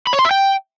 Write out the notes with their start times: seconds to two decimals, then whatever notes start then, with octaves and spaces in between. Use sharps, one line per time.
0.07 B5
0.13 C#5
0.19 C6
0.25 E5
0.31 G5